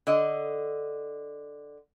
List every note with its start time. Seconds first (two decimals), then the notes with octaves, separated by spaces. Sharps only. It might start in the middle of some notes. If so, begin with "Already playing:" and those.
0.07 D3 D#5